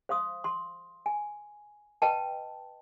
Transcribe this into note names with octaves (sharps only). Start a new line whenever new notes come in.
C5 F5 C6 D#6
C6
G#5
B4 D#5 G5 A5